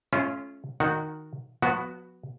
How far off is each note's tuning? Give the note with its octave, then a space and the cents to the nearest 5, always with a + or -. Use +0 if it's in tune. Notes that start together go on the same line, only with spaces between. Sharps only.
A3 -45 C#4 +0 F4 -25
D#3 -5 F#4 -15 F#5 +0
F3 +45 B3 +0 F#4 +0